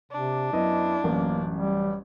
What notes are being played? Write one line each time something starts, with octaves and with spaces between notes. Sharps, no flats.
C3 D4
F#2 B3 E4 D#5
A1 F#2 A#3
G3